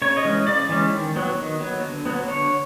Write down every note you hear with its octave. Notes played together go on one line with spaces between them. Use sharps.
C#3 C#5
D#5
E3 G#3 C#4
C#3 D5
E3 G#3 C#4
D#3
F#3 B3
D#3
F#3 B3
D3
F#3 B3
D3 C#5